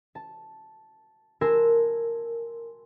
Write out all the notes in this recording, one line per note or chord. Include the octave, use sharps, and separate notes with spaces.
A5
A#4 G#5 A5 C6 E6 F#6